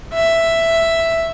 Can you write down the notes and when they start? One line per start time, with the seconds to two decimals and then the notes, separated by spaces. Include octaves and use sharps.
0.13 E5